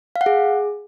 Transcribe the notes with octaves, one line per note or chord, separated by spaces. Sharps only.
F5
F#5
G#4